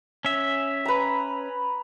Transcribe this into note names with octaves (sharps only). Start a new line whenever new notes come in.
C#4 E5
B4 A#5